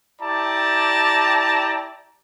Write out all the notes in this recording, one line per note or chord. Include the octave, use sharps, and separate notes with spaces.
E4 G4 D5 G5 A5 A#5